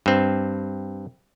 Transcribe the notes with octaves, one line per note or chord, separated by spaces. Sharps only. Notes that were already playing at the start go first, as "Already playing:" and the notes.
G2 C4